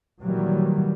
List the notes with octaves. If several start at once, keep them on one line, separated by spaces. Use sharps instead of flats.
A#2 D#3 E3 F#3 G3